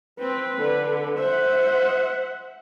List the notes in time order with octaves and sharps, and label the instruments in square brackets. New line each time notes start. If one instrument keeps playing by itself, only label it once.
[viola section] C4 [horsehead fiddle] B4
[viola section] D3
[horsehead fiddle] C5 [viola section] E5 F#5